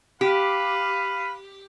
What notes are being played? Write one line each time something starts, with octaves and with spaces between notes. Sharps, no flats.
G4 B4 F5